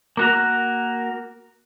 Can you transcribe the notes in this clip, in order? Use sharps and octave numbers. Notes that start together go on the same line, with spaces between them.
A#3 F#4 A#4